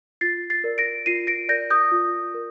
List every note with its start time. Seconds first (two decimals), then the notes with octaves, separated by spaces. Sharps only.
0.21 F4 A6 C7
0.50 A6 C7
0.64 A#4 D5
0.78 A#6 D7
1.06 F4 C7 D#7
1.27 A#6 D7
1.49 A#4 D5 G6 A#6
1.70 D#6 G6
1.92 F4
2.34 A#4